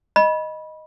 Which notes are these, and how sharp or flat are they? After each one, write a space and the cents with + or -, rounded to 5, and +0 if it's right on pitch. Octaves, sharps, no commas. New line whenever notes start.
D#5 +0 B5 -20